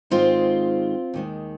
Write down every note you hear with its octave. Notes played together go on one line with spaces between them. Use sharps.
G#2 D#3 G#3 C4 F4
D#2 D#3 G#3